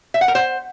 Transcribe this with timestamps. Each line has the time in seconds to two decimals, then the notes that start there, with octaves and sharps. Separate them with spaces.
0.14 E5
0.21 F#5
0.28 A#4
0.35 C5